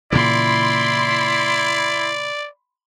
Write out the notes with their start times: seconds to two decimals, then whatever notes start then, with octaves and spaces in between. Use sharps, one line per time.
0.13 A#2 C#3 E3 E4 D5 B5 C6